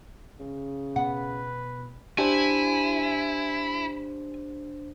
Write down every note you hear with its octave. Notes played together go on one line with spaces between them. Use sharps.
C#3
B2 B3 B4 F#5
D4 E4 G4 C5 G#5